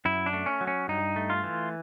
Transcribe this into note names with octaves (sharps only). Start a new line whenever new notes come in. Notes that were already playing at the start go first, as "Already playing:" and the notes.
F#2 E4
D4
A3
C#4
F#3
C#4
G2 D#4
A3
F4
E3